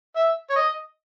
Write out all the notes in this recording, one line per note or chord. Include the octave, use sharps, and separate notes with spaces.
E5
C#5
D#5